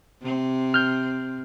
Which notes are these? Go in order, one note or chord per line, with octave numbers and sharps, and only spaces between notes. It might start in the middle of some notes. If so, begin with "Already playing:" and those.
C3 C4
F6 G6